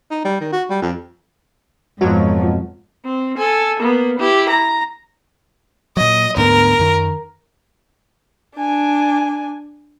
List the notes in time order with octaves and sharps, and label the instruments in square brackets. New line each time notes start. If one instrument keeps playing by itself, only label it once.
[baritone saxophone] D#4
G3
D#3
F#4
G3
F2
[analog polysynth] F2 B2 F#3 [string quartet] G#2 F3 [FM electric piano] F#4
[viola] C4
A4 G#5
A#3 B3
E4 G4
A#5
[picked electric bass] A#2 F#3 [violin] D#5
[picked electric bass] D2 G#2 B3 [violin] A#4
[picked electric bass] F#2 D#3
[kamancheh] D4 G#5